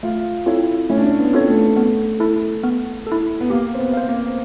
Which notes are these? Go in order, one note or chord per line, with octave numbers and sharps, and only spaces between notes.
A3 F4
C4 E4 F4 A4 C#5
A3 C#4
D4
C#4
B3
C4 F4 A4 C#5
A3
B3
E4 A4
B3
A4
E4
B3
A#3 G4
C4
B3
C5 F5
A#3